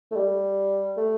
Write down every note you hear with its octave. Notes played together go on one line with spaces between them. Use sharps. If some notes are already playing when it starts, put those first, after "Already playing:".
A3
G3
A3